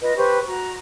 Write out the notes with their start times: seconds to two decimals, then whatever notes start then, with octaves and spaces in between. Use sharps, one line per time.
0.01 F4 B4 D#5
0.16 G4 B4 C5 C#6
0.47 F#4 A#5